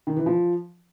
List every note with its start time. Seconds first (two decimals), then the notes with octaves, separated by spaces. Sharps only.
0.07 D#3
0.16 E3
0.26 F3